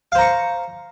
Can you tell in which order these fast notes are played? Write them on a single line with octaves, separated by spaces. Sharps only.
F5 C5 A#5 C#6